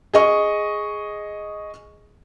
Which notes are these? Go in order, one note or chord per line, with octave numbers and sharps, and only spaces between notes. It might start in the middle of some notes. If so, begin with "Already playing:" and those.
G#4 D#5 C#6